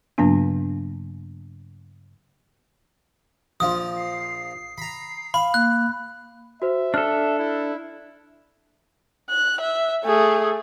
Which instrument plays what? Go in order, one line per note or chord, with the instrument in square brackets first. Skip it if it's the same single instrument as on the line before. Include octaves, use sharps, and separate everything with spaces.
[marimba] G2 C#3 F#3 A#3 B3 D4
[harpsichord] A#1 F3 F4 [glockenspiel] D#6
[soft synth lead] C7
[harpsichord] A#5 B5
[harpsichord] F5 [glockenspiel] B5
[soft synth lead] A#3 [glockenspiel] F#6
[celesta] F#4 C5 [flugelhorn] E5
[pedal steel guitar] D4 A4 [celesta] F6
[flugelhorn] E4
[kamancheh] F#6
E5
A3 G#4